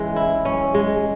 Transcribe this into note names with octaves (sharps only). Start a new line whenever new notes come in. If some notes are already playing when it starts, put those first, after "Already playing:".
Already playing: E3 G#3 C#4
E4
C#4
G#3